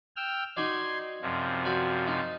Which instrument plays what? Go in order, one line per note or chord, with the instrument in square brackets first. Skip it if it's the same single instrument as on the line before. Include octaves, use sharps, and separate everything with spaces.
[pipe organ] G5 E6 F6
[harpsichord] D#4 F#4 D5 [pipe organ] C6 G#6
[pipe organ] F#2 C3 F3
[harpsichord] F#4 D5
D#4